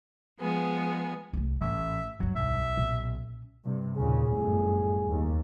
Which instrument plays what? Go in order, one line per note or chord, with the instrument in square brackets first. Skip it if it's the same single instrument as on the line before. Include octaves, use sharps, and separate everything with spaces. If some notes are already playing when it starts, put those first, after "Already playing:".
[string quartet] F3 G#3 B3 G#4
[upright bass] C2 A3
[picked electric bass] A1 [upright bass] G#2 [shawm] E5
[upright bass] D2 G2 [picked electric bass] F#3
[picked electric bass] B1 [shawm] E5
[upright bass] A#2 C#4
[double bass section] G2 C3
[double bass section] D#2 A#2 C#3 [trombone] G#4
[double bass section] G1 F#2 A2
D#2